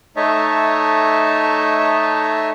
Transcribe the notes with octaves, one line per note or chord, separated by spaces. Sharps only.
A3 D#4 C#5 D#5 E5 A5